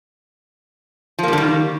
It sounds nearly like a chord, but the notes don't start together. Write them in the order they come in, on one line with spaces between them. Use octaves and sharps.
F3 A#3 G3 D3 D#3